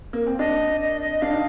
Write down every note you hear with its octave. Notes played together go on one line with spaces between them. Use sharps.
A#3
C4
D4 D#5
D#5
D#5
D4 F5
D#4